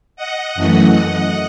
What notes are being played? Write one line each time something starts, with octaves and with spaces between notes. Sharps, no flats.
D#5 F#5
F#2 E3 A3